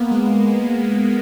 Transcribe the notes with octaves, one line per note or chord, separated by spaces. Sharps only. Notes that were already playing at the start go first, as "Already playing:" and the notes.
Already playing: A#3 B3
G#3